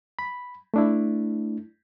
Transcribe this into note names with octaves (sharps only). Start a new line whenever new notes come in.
B5
A3 D4 E4